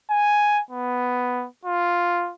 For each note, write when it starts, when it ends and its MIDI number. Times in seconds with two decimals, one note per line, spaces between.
0.10 0.61 80
0.70 1.46 59
1.65 2.32 65